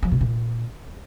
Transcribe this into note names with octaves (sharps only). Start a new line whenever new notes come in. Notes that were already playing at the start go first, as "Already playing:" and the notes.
F3
B2
A#2